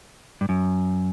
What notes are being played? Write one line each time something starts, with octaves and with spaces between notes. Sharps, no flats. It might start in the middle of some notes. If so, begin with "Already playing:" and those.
G2
F#2